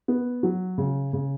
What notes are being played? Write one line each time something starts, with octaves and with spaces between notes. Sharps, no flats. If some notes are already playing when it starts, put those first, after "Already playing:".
B3
F#3
C#3
C#3